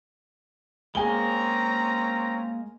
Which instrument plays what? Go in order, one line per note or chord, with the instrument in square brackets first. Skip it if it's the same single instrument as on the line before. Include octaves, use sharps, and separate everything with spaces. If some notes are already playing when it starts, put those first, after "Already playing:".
[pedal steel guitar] G#3 A#3 [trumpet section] C4 C#4 A#5 [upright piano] G#4 G#5 G7